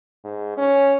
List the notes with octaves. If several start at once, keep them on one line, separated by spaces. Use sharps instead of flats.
G#2
C#4